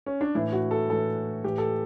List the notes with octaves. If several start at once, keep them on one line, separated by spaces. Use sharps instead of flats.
C#4
D4
A2 E3 E4
F#4
A4
A2 E3 A4
A2 E3 G4
A4